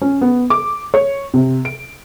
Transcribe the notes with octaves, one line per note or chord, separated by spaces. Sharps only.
C#4
B3
D6
C#5
C3
D7